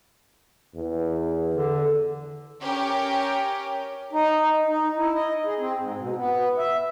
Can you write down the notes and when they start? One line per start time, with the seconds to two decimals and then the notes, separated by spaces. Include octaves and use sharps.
0.75 E2
1.54 D3
2.60 C#4 G4 A#4 G5
4.13 D#4
4.67 D#4
4.96 E4
5.14 D#5
5.45 G#4
5.59 C4
5.78 G#2
5.99 B2
6.16 B3
6.58 E5